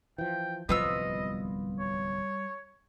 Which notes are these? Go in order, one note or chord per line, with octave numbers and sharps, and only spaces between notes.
E3 F3 G5
D1 C2 F3 G3 B3 F4 D#5 E6
C#5